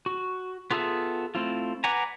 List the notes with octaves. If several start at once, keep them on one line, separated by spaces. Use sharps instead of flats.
F#4
B3 F4 G#4 A4 E5
A3 C4 E4 F4
B4 D5 F#5 G#5 A#5